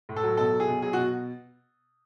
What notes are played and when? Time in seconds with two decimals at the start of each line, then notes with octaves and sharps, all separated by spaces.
0.09 A2
0.16 A4
0.23 F#3
0.37 B2 A4
0.52 F#3
0.60 G#4
0.67 B2
0.82 F#3 G#4
0.93 B2 F#4